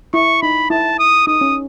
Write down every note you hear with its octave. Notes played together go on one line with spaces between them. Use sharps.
E4 C#6
D#4 B5
E4 A5
D#6
D#4 D#6
C#4